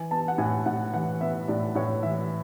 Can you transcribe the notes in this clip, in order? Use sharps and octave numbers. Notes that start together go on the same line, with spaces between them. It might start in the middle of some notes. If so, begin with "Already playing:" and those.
Already playing: E3 G#5
B3 A5
F#5
A2 G#5
A2 F#5
E3 F#5
B3 E5
A2 D5
A2 C#5
E3 E5